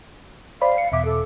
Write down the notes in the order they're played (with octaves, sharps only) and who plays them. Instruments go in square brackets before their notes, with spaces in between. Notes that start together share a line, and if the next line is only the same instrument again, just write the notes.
[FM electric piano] C5 D5 B5 [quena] F5
[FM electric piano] C#7
[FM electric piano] E2 B2 D6 [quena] E5
[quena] A4